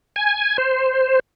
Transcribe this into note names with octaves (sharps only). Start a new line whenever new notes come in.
G#5
C5